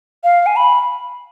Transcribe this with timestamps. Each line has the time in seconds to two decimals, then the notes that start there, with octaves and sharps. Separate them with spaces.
0.24 F5
0.46 G#5
0.56 B5